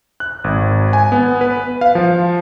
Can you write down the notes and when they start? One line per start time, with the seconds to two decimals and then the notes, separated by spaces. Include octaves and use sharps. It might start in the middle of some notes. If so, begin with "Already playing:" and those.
0.20 F#6
0.44 G#1
0.93 G#5
1.12 B3
1.41 B4
1.81 F5
1.95 F3